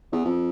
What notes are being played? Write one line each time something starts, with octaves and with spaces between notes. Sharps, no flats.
E2
F2